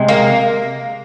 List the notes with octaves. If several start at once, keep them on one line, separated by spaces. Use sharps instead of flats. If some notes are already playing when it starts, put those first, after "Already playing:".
Already playing: C3 G#3
A#3